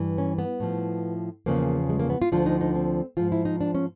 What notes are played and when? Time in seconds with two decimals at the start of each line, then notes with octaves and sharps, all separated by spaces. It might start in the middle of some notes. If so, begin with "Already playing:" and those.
Already playing: G2 E3
0.18 C#4
0.39 B3
0.60 A2 F3
1.46 E2 C#3 F3 A#3
1.89 G#3
1.99 A#3
2.10 B3
2.22 F4
2.32 D2 D3 F3 F4
2.46 D#4
2.61 D#4
2.75 C4
3.17 G#2 F3 F4
3.32 E4
3.45 D#4
3.61 D4
3.75 C#4